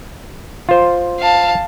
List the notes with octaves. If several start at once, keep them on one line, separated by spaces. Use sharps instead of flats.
F4 C5
F5 A5